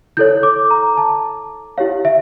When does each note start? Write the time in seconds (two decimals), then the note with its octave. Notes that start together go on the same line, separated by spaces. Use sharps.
0.17 E4 A4 C#5 G6
0.43 D6
0.71 A#5
0.98 A5
1.78 E4 G4 C#5 F5
2.05 E5